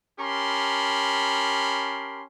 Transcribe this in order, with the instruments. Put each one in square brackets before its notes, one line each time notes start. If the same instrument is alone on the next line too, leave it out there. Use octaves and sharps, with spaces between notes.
[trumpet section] C#4 G4 A#4 A5 B5 C6